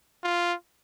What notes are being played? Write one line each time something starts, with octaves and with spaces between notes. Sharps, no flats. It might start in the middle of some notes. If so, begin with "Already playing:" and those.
F4